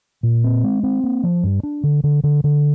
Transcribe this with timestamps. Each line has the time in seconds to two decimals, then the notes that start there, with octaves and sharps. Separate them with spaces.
0.23 A#2
0.44 C4
0.64 G#3
0.83 C4
1.04 A#3
1.23 F3
1.43 G2
1.63 D4
1.84 D3
2.04 D3
2.24 D3
2.44 D3